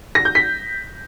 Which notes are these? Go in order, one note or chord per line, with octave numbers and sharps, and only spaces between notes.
A#6
G6
B6